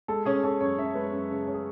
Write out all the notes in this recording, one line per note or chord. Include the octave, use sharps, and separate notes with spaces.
G#3 A4
C#4 G#4
C#4 A4
F#2 C#5
F#2 E5
G#3 B4
F#2
C#3
C#4
G#4